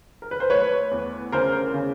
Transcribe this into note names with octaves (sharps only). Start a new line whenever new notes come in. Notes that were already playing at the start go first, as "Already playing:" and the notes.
A#4
B4
C5
A3 B4 C#5
E2
C#3 A#4 C5
C#3